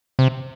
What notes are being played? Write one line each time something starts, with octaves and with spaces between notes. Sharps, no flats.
C3